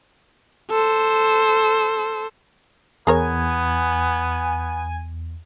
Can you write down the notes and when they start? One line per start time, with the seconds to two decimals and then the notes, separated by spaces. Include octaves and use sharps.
0.70 A4 C5
3.07 E2 B3 G#4 A#4 C#5 G#5